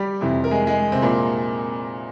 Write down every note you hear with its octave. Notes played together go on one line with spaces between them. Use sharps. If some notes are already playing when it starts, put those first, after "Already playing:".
Already playing: G3 G4
F2 C3 E3
A#4
G#3 G#4
G#3 G#4
C3 C4
A#2 A#3